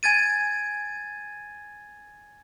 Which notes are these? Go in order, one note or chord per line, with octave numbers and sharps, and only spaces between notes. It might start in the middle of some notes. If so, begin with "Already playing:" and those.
G#5 G#6 A6 D#7